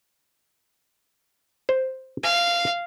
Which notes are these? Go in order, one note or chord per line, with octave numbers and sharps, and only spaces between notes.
C5
F5 G#5